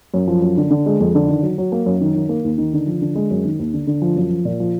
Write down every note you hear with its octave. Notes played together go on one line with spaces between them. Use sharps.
F#2
F3
F#2
D3
D3
G#3
F2
D3
D#3
F#3
F#3
A#3
F#2
D#3
D#3
A#3
D#2
D#3
D3
F3
D3
G#3
F#2
D#3
D#2
D3
D3
F3
F#2
F3
A#2
F3